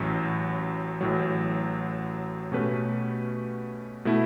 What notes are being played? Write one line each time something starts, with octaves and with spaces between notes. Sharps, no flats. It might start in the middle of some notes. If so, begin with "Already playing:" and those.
Already playing: A1 A2 F#3 C#4
A1 A2 F#3
B2 A3 C#4 G4 B4
B2 A3 E4